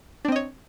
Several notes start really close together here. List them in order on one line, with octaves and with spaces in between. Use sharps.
D4 C4 D#5 C#5